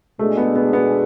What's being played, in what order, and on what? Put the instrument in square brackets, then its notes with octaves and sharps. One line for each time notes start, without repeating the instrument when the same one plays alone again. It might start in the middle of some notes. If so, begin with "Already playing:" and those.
[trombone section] B2 G#3 D4 G#4 [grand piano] A3
[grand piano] B3
B3
B3